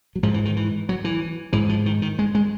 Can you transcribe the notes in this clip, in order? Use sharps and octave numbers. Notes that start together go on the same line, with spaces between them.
F#3
G#2 F3
E3
D#3
E3
F#3
E3
G#2 E3
F3
D#3
D#3
G#3
G#3